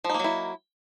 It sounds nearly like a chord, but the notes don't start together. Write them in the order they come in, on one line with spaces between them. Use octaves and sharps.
F3 D#4 A#3 F#3 E4